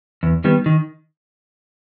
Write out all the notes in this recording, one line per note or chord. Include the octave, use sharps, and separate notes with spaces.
E2
D#3 G3 B3
D#3